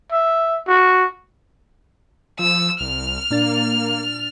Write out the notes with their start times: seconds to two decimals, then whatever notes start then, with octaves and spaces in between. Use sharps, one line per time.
0.12 E5
0.67 F#4
2.39 F3 E6
2.80 C2 F6
3.31 A#2 A#3 D4 A6